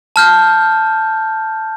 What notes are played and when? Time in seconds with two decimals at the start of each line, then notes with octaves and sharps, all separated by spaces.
0.16 A5 F6 G6